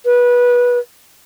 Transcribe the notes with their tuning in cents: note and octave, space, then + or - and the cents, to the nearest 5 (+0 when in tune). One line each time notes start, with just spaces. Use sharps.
B4 -20